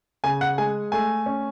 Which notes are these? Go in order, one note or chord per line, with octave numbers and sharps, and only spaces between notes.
C#3 G#5
F#5
G#3 G#5
A3 G#5
C#4